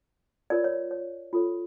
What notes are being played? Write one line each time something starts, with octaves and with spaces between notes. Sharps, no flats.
F4 A#4 C#5 D5
C#5
C#5
F4 A4 C#5